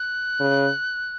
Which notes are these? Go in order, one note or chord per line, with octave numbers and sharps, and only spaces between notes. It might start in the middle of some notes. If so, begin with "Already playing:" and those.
Already playing: F#6
C#3